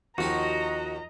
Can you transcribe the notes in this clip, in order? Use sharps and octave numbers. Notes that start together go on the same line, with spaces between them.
D#2 F3 D#4 F#4 G4 D#5 A#5